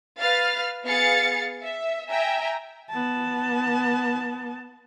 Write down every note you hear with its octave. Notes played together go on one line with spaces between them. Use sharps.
B4 F5 F6 A6
B3 G#4 F5 A6 C#7
E5
E5 G5 G#5 A#5
B3 A5